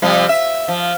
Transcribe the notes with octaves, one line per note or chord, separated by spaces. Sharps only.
C3 F3 G3
E5
F3